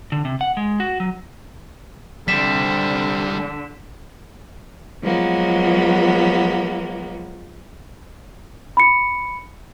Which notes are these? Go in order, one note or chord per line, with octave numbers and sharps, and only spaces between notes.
D3
C3
F#5
G#3
F#4
F#3
D3 G3 C4 B6 E7
F3 F#3 G#3 A#3 B3
B5 C#7